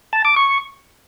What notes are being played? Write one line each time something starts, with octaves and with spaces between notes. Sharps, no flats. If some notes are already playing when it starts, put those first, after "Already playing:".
A5
D6
C#6